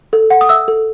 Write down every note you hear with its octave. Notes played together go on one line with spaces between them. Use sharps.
A4
F#5
D#6
E5 E6
A4